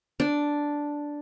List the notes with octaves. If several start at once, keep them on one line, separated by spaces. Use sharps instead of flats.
D4